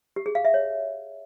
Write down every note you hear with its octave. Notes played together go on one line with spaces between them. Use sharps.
G4
G#4
F5
E5
C#5